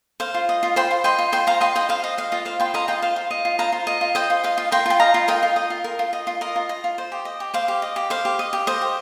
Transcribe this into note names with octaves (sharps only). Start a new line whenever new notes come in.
C5 F5
F4
D#5
F4
C5 G5 C6
F4
D#5 G5 C6
F4
C5 G5 C6
F4 F5 A#5
D#5 G5 C6
F4 D#5 G5
C5 F5
F4 D#5
D#5 F5
F4 D#5
C5 F5
F4 G5 C6
D#5 F5 A#5
F4 D#5 G5
C5 F5
F4
D#5
F4
C5 F5 A#5
F4
D#5
F4
C5 D#5 G5
F4
D#5 F5
F4
A#4 G5 C6
F4 G5
D#5 F5 A#5
F4
A#4 D#5 G5
F4
D#5
F4
A#4
F4
D#5
F4
A#4 D#5
F4
D#5
F4
C5
G4
D#5
G4
C5 F5
G4
D#5
G4
C5 F5
G4
D#5
G4
C5 D#5
G4